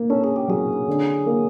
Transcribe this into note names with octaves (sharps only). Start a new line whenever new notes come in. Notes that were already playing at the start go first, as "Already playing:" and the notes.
Already playing: A#3
C#4 A4
G#4
G4
F#3 G#4
D3
A#3